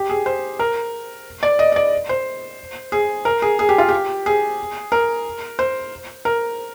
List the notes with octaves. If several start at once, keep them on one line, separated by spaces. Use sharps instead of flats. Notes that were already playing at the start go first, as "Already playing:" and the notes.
Already playing: G4
G#4
C5
A#4
D5
D#5
D#5
D5
C5
G#4
A#4
G#4
G#4
G4
F4
G4
G#4
A#4
C5
A#4